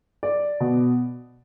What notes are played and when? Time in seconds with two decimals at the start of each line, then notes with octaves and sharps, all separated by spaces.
0.23 D5
0.60 B2